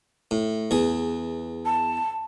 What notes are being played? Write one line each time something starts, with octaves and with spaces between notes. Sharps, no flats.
A2
E2 G#4
A5